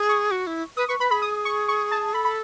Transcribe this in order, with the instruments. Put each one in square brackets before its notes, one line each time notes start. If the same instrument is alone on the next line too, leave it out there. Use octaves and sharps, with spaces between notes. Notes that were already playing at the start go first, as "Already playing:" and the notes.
Already playing: [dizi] G#4
[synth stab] C#6
[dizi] F#4
E4
[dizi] B4 [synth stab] D#6
[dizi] B4 [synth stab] C#6
[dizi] B4 [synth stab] B5
[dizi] G#4 [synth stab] B5
[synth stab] D#6
C#6
C#6
A5
[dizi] A4 [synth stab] B5
[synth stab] B5